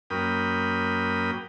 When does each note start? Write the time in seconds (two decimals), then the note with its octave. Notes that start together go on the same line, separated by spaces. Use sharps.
0.10 F#2 A#3 G5 B5 D#6